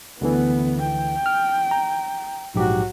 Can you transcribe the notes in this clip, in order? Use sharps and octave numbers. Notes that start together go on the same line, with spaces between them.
D2 D3 E3 B3
G5
F6
A#5
A#1 G#2 F#3 F#4 G4